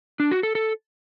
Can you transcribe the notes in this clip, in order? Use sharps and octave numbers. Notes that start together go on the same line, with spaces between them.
D4
F#4
A4
A4